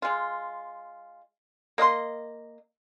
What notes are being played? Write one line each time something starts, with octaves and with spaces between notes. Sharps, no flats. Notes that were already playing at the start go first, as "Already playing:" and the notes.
G#3 F4
A#3 D#5 F5 C6